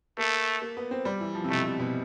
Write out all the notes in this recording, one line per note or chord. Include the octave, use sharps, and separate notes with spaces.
A3 A#3
A#3
B3
C4
G3
E3
F3
C3
B2 A3
C3
B2